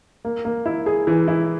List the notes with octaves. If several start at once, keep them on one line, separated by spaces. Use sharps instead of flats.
A#3
A#3
E4
G#4
E3
E4